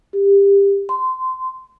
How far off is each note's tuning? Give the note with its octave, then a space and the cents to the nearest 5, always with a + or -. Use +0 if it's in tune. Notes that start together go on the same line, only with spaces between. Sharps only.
G4 +25
C6 -20